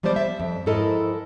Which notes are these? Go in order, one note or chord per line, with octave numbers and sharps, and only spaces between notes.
F3 G3 G#3 B3 C5 D5
E5
F2
G#2 F3 E4 A4 A#4 D#5